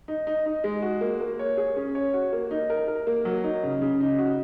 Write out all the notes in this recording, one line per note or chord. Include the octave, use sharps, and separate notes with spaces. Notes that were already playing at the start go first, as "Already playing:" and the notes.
D#4
D#4
D#4
G#3
F#4
A#3
A#3
C#5
G#4
C#4
C#5
F#4
A#3
D#4
A#4
A#4
A#3
F#3
D#4
C#3
C#3
D#4
F#4